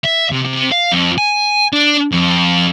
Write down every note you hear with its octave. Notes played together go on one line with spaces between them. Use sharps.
E5
C3
C3
F5
F2
G#5
D4
F2